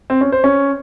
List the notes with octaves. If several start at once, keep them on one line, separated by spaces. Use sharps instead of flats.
C4
C#4
C5
C#4